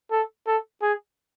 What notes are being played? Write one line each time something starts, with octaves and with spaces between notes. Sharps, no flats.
A4
A4
G#4